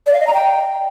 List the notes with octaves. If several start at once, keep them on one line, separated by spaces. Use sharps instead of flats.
D5
F5
D#5
A#5
G5